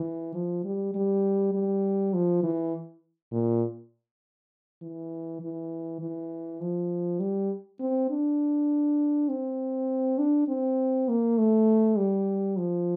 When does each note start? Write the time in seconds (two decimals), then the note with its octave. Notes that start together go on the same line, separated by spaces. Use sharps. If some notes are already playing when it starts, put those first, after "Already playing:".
Already playing: E3
0.34 F3
0.64 G3
0.94 G3
1.54 G3
2.14 F3
2.43 E3
3.32 A#2
4.82 E3
5.42 E3
6.01 E3
6.61 F3
7.20 G3
7.80 C4
8.10 D4
9.29 C4
10.18 D4
10.48 C4
11.09 A#3
11.38 A3
11.98 G3
12.57 F3